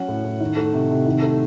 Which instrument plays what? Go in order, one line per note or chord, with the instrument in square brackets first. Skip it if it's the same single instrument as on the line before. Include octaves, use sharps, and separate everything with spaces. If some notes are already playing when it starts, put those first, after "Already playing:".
Already playing: [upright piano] F#3 C#4 F#5
A2
A2
D#3
A3
C3
C3
D#3
A3